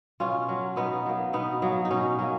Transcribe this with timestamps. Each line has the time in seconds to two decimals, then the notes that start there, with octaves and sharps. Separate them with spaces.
0.20 B2 C#4 F4
0.49 F#3 A#3
0.76 B2 B3 D#4
1.06 F#3 A#3
1.33 B2 B3 D#4
1.62 F#3 A#3
1.85 D#4
1.91 B2 C#4
2.18 F#3 A#3 C#4